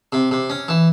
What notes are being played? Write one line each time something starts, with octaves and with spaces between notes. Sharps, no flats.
C3
C3
C#4
E3